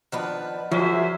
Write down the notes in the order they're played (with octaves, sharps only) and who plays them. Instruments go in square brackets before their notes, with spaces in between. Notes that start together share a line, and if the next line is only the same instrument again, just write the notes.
[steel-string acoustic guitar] D#3 F3 B4 [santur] B3 D4 F#5
[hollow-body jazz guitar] F3 [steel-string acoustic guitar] F#3 [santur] F#4 A#4 C#5 [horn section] G#4 C5 E5